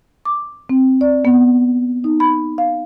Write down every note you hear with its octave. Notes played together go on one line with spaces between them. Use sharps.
D6
C4
D5
B3
D#4
B5
F5